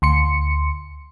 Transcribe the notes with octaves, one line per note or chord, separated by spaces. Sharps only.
D2 C6 C#7